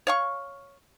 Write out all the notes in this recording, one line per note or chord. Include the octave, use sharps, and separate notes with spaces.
C#5 F5 C#6